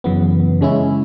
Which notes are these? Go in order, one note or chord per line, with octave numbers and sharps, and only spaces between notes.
F#2 C#3 E3 B3
C#3 G#3 C#4 E4